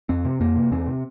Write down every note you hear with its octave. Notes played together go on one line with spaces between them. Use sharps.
F2 C4
C3
F2 A#3
C3
E2 C4
C3